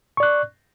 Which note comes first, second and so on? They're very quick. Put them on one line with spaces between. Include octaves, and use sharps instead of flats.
C#6 D5 F#6